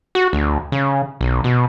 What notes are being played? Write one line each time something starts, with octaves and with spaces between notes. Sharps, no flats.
F#4
D2
C#3
B1
B2